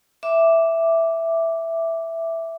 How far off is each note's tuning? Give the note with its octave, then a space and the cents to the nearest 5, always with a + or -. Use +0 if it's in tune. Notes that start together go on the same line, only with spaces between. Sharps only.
E5 +0 D6 +0